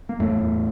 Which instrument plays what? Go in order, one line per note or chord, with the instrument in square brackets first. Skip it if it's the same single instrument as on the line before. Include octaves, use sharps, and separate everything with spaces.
[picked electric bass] A#3
E2 A2 A3
E2